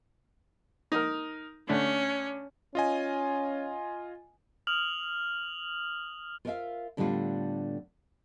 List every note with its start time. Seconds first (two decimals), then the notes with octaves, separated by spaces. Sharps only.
0.92 D#4 A#4
1.69 D3 A3 C#4 D4
2.75 C#4 F4 D#5 G#5
4.67 D#6 F6 F7 F#7
6.45 F4 A#4 C5 C#5 E5 F5
6.97 A2 D3 G3 B3 D4 F4